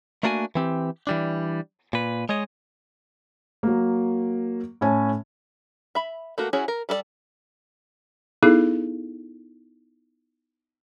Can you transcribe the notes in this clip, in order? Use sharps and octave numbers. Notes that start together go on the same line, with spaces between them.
A3 A#3 D4 F#4 G5 G#5
E3 C4 G4
E3 G3 D4
A#2 B4
G#3 C#5 D#5
F#3 A#3
A2 C#4 G#5 A5
E5 B5
A3 A#3 F#4
C#4 E4 F#4 G#4 C#5
A#4
G3 A4 B4 D5
B3 D#4 E4 G#4 A4